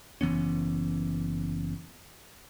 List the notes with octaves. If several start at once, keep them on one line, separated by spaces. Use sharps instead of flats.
F#1 E3 B3 C#4